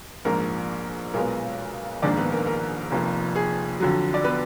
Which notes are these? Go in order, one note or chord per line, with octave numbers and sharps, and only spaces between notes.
A#1 G#2 F3 A#3 A#4
B1 A#2 G#3 B3 A#4
A#1 G#2 D#3 A#3 D4 D5
B3 B4
A#4
A#4
F1 F2 F3 A#3
G#4
F2 D3 F#3
D5
B3 B4